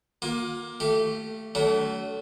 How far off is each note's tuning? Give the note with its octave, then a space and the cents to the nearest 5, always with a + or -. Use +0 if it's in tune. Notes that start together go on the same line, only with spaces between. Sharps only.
A#3 +15 F4 +40
A3 +0 G4 -20 F5 -30
F#3 +35 A3 +0 D4 -40